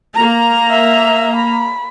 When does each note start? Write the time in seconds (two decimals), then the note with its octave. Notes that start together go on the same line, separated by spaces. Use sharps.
0.14 A#3 A#5
0.70 E5
1.36 B5